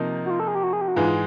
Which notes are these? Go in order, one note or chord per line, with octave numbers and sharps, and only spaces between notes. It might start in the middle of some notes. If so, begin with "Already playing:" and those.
Already playing: C3 F3 A#3 D#4
F#4
F4
A4
G#4
G4
F#4
G#4
G4
F#4
G#2 E3 G#3 F4